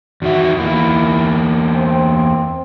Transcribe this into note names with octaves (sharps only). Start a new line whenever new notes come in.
E2 D#3 F#4 E5
E2 A#3 E4
C4